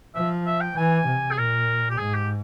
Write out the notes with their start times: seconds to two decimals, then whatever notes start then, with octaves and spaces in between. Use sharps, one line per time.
0.15 F3 E5
0.46 E5
0.61 G5
0.77 E3 G#5
1.07 C3
1.31 G#4
1.37 A#2 A#4
1.90 G4
1.98 G#2 G#4
2.14 G4